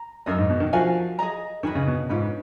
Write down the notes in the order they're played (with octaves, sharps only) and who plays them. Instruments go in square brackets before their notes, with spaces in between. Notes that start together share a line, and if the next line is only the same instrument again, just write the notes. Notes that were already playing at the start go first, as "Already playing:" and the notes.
Already playing: [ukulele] A#5
[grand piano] F#2 [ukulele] D#4 A#4 D#5
[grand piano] G#2
B2
D#3
[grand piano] F3 [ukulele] F#4 A#4 F5 G#5
[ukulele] G#4 D#5 A#5
[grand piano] D#3 [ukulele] C#4 G#4 B4 D#5
[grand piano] C#3
B2
[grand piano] G#2 [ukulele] C#4 F4 B4